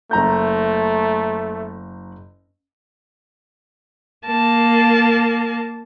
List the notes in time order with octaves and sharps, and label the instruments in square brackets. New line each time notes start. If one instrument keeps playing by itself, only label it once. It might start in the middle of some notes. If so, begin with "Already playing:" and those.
[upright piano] F#1 A#5 G6 [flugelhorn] A3
[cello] A#3 [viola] A5